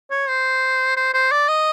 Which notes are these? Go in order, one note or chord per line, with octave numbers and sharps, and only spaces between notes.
C#5
C5
C5
C5
D5
D#5